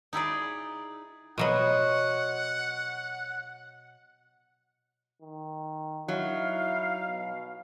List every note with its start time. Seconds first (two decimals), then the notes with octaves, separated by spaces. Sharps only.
0.13 D#4 E4 G#4 D5
1.38 B2 F#3 B3 C#5 D#5 F#5 C6
5.22 D#3
6.08 F#3 D#4 E4 F5
7.08 B2